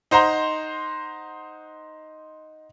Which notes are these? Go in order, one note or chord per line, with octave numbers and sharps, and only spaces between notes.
D#4 C5 F#5 A#5 C6